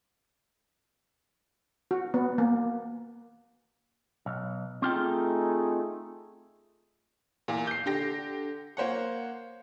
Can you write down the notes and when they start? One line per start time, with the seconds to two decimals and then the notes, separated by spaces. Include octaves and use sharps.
1.91 F#4
2.14 B3
2.38 A#3
4.26 B1
4.82 A3 C4 D#4 F4 G#4 G5
7.48 E2 A#2
7.67 G6 C7
7.86 D3 G4 A#6
8.77 A#3 C5 C#5 F#5